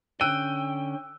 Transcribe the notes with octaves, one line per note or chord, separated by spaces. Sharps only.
D3 C#4 G5 E6 F#6 D#7